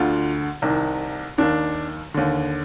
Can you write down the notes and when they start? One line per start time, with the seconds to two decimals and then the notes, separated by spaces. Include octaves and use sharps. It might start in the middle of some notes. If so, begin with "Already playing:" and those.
Already playing: D2 D3 F4
0.62 C2 C3 D#3
1.38 D#2 D#3 D4
2.14 D#2 D3